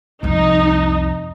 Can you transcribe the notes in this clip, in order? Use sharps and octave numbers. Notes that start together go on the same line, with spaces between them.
C2 F2 D#4